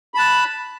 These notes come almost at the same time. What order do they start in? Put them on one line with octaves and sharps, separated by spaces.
B5 A5 F#6